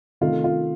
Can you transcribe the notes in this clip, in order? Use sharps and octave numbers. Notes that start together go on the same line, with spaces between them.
C3 D#3 A3 F4
F4